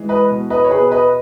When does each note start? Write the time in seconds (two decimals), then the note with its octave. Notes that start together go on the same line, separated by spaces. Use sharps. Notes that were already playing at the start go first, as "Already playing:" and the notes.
Already playing: E3 G#3
0.09 B4 D#5
0.30 B2
0.50 B4 D#5
0.64 C#5
0.71 B2 G#4 B4
0.92 B4 D#5